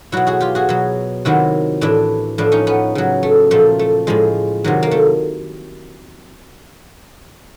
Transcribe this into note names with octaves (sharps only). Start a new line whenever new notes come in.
B2 F#3 E4 F#4
F#4 G#4
F4 G4
F#4 G#4
B2 F#3
C3 D#3 F#3 E4 F#4
A2 E3 D4 E4
A2 F3 D4 E4
C#4 D#4
B3 C#4
C#3 F#3
A3
A#2 F3 A3
A3
A2 F3 G#3
C3 D#3 F#3
A#3
A3